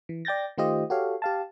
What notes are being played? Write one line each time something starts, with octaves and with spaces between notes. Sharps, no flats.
E3
D5 G5 G6 A6 A#6
D#3 A3 F4 G4 C5 D#5
F#4 G4 A4 C#5 F5
G4 F5 A5